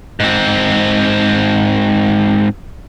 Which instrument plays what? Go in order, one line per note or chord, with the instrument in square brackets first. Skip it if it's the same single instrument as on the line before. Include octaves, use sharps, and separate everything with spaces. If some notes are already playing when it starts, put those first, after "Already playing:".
[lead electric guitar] G#2 C4